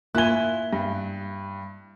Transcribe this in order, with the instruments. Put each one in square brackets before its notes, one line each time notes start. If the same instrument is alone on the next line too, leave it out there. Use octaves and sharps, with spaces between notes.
[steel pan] A#3 F4 G#5 [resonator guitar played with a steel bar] E4 [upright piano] F#6 G7
[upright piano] G2